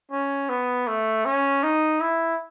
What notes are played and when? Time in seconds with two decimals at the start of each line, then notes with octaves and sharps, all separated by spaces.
0.11 C#4
0.49 B3
0.87 A3
1.25 C#4
1.63 D#4
2.01 E4